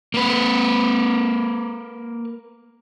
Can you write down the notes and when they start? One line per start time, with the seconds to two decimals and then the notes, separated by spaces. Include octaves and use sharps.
0.14 A#3 B4